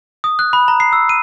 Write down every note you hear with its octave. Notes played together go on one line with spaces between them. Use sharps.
D#6
F#6
B5
A#5
C7
E6
D#7